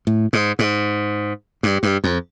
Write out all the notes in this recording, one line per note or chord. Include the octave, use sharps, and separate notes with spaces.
A2
G#2
G#2
G2
G2
F2